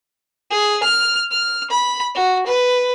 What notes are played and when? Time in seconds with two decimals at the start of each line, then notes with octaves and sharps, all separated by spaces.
0.51 G#4
0.83 F6
1.31 F6
1.70 B5
2.15 F#4
2.46 B4